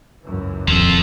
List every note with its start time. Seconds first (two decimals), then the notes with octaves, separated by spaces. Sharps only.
0.24 C#2 F#2 E3
0.68 D#1 F2 F3 A4